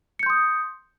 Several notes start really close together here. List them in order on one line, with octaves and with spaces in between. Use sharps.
C#7 G6 C6 D#6